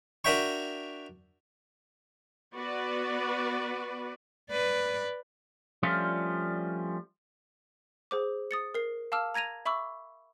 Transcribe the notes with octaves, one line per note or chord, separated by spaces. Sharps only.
D4 F#4 A#4 E5 G5 C#6
B3 F#4 B4 D5
B4 D5
F3 G3 A3 C#4 D4 F4
G#4 C5 D6
D#6 A6 C#7
A#4 C7
F5 A5 D6 E6 F6
A#5 G#6 A#6 D#7 F7
E5 B5 C#6 D6 E6